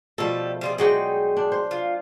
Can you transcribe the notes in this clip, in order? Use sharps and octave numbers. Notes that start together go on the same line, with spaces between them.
B2 F3 G3 A3 A4
G3 F4 G#4
F#3 G#3 D#4 F#4 D5 G5
D4
C5
F4